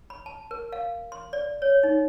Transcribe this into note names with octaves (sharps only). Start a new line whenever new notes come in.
B5
A5
A#4
F5
C6
D5
C#5
D#4